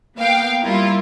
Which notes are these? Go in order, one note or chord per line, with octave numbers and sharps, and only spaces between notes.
A#3 B3 F5 G5
G3 E4 F4 A#4